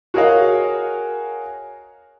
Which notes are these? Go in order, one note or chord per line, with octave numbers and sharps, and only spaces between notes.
F#4 G#4 A#4 C#5 D#5 F5